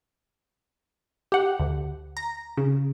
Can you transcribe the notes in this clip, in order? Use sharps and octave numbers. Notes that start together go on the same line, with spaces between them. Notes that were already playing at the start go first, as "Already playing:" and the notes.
G4 F#5
D2
A#5
C#3